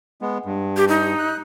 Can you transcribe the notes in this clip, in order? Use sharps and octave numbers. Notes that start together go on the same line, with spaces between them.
G#3 B3
G2
G4
D#4
F#6